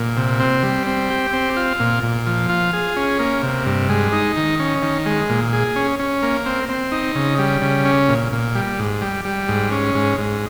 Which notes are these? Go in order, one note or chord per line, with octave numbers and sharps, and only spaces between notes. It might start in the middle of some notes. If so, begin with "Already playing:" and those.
Already playing: A#2
C3
C4
G3
C4
G4
C4
F4
A#2
A#2
F3
F4
G#4
C#4
A#3
C3
G2
G#3
D#4
D#3
C#4
D#3
G#3
A#2
G#4
C#4
C#4
A#3
C4
C4
D#4
C#3
G3
C#3
C#4
A#2
A#2
G3
G#2
G3
G3
G#2
C#4
G#2
G#2